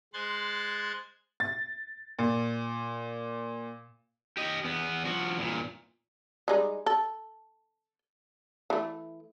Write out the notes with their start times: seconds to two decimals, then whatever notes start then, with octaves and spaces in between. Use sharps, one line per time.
0.13 G#3 C5 C6 F#6 G#6 A6
1.40 A6
2.19 A#2
4.37 G4 D#5
4.65 E2 B3
5.05 F3 F#4
5.38 E2 A#2
6.48 G3 G#3 D#4
6.86 A4
8.70 E3 A3